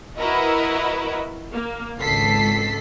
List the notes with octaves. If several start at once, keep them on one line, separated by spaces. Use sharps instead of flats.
E4 F#4 A#4 B4 D#5
A#3
G#1 C#2 A4 B6 C7